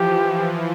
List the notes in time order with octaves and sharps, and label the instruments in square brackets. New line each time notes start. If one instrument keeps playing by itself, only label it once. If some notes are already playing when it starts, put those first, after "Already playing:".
Already playing: [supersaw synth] E3 F3 [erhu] G4